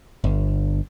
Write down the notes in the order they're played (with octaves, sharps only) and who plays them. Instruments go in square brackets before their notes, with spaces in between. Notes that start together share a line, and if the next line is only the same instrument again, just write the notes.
[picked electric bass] G1